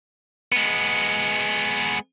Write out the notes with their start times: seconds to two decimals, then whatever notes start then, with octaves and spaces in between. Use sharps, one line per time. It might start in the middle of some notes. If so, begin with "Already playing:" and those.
0.52 G#3 B3